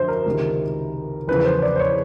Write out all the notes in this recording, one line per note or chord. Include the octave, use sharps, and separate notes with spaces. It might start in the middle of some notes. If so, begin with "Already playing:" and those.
Already playing: F#2 D3 F3 C5
A#4
C#2 C3 D#3
E2 C#3 F3 B4
B4
C5
D5
C5
C#5